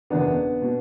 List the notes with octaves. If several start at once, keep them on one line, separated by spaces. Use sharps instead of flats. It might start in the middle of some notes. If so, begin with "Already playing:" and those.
F#1 E2 B2 B3 D4
B2